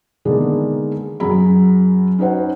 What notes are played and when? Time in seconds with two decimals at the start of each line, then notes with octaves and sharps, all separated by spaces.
0.25 D3 D#3 G#3 A#3 B3 D4
1.20 F#2 F#3 G#4 A#5 B5
2.19 C#4 D#4 F#4 C5 F#5